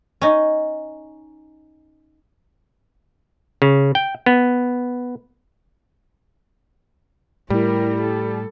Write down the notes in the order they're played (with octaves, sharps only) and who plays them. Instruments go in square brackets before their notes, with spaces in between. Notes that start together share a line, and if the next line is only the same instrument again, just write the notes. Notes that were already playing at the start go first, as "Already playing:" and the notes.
[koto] C#4 D#4
[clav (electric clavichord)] C#3
G5
B3
[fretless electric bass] A2 [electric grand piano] G3 [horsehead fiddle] E4 A#4
[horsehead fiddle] A4